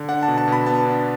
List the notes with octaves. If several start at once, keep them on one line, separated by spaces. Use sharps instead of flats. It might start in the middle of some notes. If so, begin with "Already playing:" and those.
Already playing: D3
D4 F#5
A5
B2
A5
B2 B5
B3 A5
D4